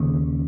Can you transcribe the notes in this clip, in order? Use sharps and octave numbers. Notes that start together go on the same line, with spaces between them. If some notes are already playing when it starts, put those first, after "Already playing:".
Already playing: D#2 C#3